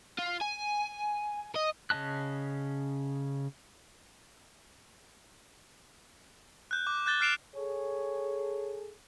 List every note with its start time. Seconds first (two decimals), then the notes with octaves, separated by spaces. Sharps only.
0.19 F4
0.42 G#5
1.55 D#5
1.90 C#3 C#4 D#5 A5 F#6
6.71 F#6 G6
6.87 D6
7.06 F#6 G6 A6 G7
7.20 F6 F#6 C7 D7 E7 F7
7.56 G#4 A4 C#5